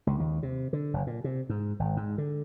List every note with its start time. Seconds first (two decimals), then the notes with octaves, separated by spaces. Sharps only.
0.07 C#2
0.20 D#2
0.43 C3
0.73 D3
0.94 F#1
1.07 A#2
1.24 C3
1.49 G#2
1.79 G#1
1.97 G#2
2.18 D3